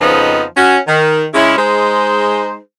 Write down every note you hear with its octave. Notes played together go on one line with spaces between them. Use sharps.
F2 C#3 F3 B3 D#4 D#5
C#4 F#4
D#3
C#3 G#3 C#4 E4
G#3 D#4 G#4 C5